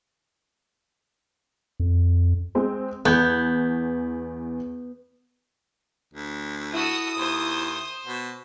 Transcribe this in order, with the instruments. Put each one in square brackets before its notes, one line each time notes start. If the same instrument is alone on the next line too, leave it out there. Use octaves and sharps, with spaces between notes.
[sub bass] F2
[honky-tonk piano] G#3 C4
[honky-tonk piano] E2 G6 G#6 [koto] B3
[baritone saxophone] D2
[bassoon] E4 [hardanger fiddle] F#4 A4 [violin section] D#6
[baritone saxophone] D#2 [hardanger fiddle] C5
[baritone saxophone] B2